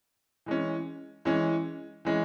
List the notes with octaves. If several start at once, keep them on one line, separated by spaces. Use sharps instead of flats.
E3 G#3 C#4
E3 G#3 C#4
E3 G#3 C#4